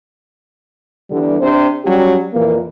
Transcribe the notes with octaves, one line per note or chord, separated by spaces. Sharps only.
E2 D3 G3
C3 D4 C5
F#3 G3 C#4 G4
F2 A#2 E3 A#3